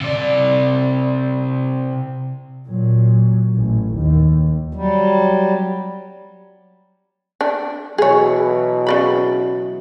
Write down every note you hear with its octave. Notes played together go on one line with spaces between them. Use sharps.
C3 D5
A#2 F#3
A1
D#2
F#3 G3
D4
B2 E3 F#3 G#4 C#5
C#3 D5 B5